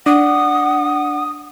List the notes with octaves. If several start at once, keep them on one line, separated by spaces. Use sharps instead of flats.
D4 F#5 D#6